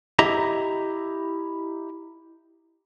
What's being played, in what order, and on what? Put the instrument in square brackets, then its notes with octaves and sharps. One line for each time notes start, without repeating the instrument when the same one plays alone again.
[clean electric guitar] E4 G4 D#5 E5 A#5